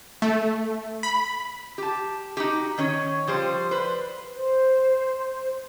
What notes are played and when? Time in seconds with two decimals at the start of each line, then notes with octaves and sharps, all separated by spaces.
0.22 A3
1.03 B5
1.78 G4 A5
2.37 D#4 F#4 G4
2.78 D#3 C#4 C#5
3.27 F3 G3 C5
3.71 B4 C5
4.31 C5